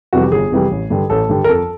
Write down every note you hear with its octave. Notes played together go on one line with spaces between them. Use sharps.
F2 C3 E3 G3 F#4
G4
G1 G#4
F2 C3 E3 G3
A1
G2 D3 G3
A1 A4
G2 D3 G3
A#4
F2 A4